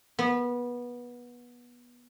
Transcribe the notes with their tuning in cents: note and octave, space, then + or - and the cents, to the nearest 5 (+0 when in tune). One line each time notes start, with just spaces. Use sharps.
B3 -20